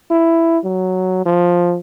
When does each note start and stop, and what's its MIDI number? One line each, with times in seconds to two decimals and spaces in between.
0.11 0.58 64
0.64 1.23 54
1.26 1.77 53